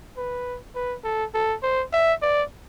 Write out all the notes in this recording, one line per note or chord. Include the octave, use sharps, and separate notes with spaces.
B4
B4
A4
A4
C5
E5
D5